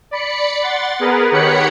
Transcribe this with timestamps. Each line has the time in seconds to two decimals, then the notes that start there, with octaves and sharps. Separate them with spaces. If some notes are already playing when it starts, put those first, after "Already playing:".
0.11 D5 B5 C#7
0.62 F#5 C6 A6
0.99 B3 G#4 A#4 B4
1.31 D#3 G4 C#5 F#5 B5 C#7